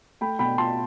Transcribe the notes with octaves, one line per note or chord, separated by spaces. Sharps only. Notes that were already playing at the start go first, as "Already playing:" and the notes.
A3 G5 B5
B2 G5 B5
F4 A5 C6